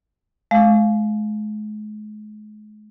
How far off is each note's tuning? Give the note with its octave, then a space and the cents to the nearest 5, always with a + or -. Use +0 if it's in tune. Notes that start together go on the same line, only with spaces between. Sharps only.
G#3 +40 F5 +0